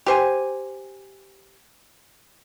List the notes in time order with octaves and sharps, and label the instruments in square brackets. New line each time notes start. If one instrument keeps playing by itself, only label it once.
[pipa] G4 C5 G#5